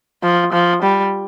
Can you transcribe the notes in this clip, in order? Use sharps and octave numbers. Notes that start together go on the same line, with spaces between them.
F3
F3
G3